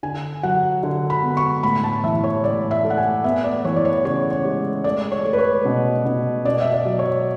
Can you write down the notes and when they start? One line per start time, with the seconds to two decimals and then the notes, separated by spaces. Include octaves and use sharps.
0.03 D3 G#5
0.43 F#3 F#5
0.83 D3
1.10 B5
1.23 B3
1.37 C#6
1.63 A2 B5
1.84 A5
2.04 E3 E5
2.24 C#5
2.44 A2 D5
2.71 E5
2.84 A3
2.90 F#5
2.98 G#5
3.24 B3 E5
3.44 D5
3.64 E3 C#5
3.76 D5
3.85 C#5
4.05 C#3 C#5
4.31 C#5
4.45 G#3
4.84 A3 D5
5.12 C#5
5.25 A3
5.33 B4
5.38 C#5
5.65 B2
6.06 B2
6.45 B2 D5
6.61 E5
6.72 D5
6.85 F#3
6.99 C#5